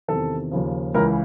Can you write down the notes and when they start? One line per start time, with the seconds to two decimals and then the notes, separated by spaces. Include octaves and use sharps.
0.08 E2 C3 D#3 A4
0.51 D#2 C#3 F3
0.94 C#2 C#3 E3 A#4